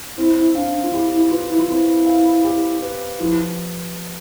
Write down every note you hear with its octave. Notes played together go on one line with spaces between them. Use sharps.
C4 E4
E4
D4 F5
D4
F4
E4 G4
E4
E4
F4 B4
E4
F4
C4 E4
F5
G4
B4
F3 E4